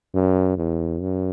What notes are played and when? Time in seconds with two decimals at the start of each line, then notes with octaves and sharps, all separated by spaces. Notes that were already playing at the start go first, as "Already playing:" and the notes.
0.15 F#2
0.58 E2
1.02 F#2